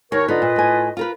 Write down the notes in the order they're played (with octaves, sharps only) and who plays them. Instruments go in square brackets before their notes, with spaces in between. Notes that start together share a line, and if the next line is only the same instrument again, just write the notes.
[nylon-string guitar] D#2 [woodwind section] A#4 C#5
[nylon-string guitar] D3 D#4 [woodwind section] F4 B4 D#5
[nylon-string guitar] A#2
A2 G#5
F4 A#4 B4